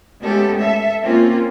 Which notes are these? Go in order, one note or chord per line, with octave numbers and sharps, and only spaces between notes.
G#3 A3 B3 C#4 G4 A4
A4 E5
A#3 C4 C#4 F4